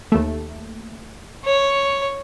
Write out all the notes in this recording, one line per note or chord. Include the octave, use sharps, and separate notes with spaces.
D#2 A3
C#5